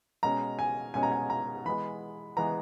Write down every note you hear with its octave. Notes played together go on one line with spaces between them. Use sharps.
B2 G#3 C#4 A#5
G#5
B2 G#3 C#4 G#5
A#5
G#5
A#5
E3 G#3 B3 B5
E3 G#3 B3 A#5